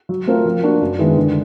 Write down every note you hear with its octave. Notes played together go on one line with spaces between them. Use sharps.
F#3
A3 C4 F4 A#4
F3
A#3 D4 F#4
F#2
D#3 G#3 B3 E4
D3